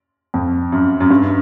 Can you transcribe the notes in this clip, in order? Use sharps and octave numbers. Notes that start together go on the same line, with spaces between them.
F2
F#2
F#2
G2